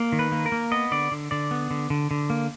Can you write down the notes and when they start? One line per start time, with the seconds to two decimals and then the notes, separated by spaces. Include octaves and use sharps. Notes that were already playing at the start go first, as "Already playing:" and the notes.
Already playing: A#3
0.12 D#3
0.19 B4
0.32 A#3
0.46 A#4
0.52 A#3
0.71 B3 D#5
0.91 D3 D5
1.11 D3
1.31 D3 D5
1.51 B3
1.71 D3
1.90 D3
2.11 D3
2.30 A#3